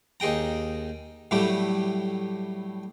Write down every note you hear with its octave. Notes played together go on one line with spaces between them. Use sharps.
D#2 D#4 G#4 G5 A#5
A2 F#3 G3 A3 E4 G4